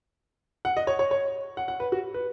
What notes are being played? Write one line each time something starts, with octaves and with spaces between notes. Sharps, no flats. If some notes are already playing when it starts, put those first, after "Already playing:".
F#5
D#5
C#5
C#5
C#5
F#5
F#5
B4
F#4
B4